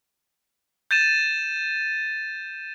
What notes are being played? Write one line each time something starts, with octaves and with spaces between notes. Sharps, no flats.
G6 A6 D#7 E7